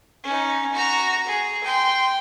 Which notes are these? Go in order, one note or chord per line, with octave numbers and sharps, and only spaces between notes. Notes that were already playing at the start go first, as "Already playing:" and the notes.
C#4 D#4
F#4 A#5
G#4
G5 C6